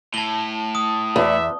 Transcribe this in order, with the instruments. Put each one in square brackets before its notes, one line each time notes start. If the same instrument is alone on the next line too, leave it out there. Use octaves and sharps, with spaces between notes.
[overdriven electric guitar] A2 [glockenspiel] A5 G7
[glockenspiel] D#6
[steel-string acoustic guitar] E2 [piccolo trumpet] E5